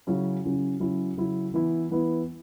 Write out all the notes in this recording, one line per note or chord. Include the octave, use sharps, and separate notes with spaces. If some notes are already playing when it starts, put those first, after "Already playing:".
C#3 F#3 C#4 E4
C#3 F#3 C#4 E4
C#3 F#3 C#4 E4
C#3 F#3 C#4 E4
E3 B3 E4
E3 B3 E4